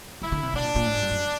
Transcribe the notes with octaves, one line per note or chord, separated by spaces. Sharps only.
D3 E4
D3
C3
B2 D4
A#2
A#2
A2
G#2
G2
F#2